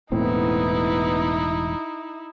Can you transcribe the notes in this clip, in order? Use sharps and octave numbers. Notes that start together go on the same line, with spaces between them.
E1 A2 B3 C4 D#4 E4